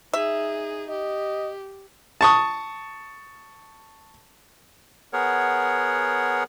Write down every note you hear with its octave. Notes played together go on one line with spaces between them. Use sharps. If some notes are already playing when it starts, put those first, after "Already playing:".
D#4 G#4 E5
G4 D#5
A5 C#6 D#6
B3 G#4 A#4 C#5 F#5